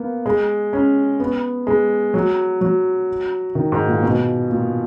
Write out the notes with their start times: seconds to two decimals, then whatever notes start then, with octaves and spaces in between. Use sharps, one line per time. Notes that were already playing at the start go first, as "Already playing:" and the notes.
Already playing: A#3 B3
0.26 G#3
0.73 C#4
1.20 B3
1.67 G#3
2.14 F#3
2.61 F#3
3.55 D#3
3.72 G#2
3.87 A#2
4.03 B2
4.50 A#2